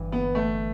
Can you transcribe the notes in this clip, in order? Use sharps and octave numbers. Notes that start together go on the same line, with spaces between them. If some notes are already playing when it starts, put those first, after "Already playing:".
Already playing: G1 G2 E3
B3
A3